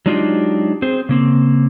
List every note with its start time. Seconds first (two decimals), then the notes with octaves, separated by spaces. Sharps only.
0.06 F#3 G#3 D4 D#4 F4 G4
0.82 C4 G#4 C5
1.09 C#3 A#3 C4